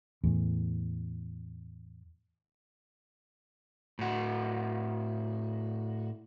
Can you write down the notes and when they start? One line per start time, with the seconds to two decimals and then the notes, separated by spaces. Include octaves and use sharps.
0.24 E2 A2
3.99 A2 F#4